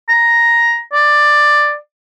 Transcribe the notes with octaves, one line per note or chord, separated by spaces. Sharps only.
A#5
D5